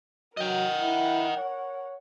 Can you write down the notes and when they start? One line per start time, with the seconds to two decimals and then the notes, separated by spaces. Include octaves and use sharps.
0.37 F#3 A#4 D#5 F#5 G5
0.80 E4
1.37 C#5